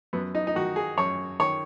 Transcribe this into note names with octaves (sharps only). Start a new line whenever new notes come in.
F#2 B3
D#4
D#4
D#3 F#4
G#4
F#2 C#5
D#3 C#5